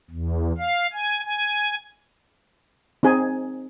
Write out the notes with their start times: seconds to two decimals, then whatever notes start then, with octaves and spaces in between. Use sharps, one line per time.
0.11 E2
0.58 F5
0.93 G#5
1.25 G#5
3.03 C4 D#4 G#4 G#5